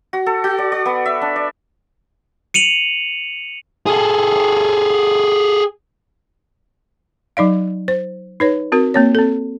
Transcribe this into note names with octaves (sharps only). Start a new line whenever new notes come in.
F#4
A4
F#4
D5
D5
B3
E5
D4
D5
C#7 D#7 F7 F#7
G#4 A4
F#3 D#4 D5 F5
C5
D#4 B4 C#5
C4 F#4 A#4
A#3 C4 C#5
C4 A4